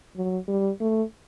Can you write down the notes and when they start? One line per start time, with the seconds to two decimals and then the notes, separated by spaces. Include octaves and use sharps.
0.16 F#3
0.48 G3
0.80 A3